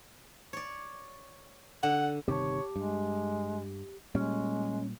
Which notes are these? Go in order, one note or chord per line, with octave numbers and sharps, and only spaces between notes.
C#5 D5
D3 F#5
G1 C3 D#3 G4 C#5 A5
G2 G#3
A#2 G3 G#3 C#4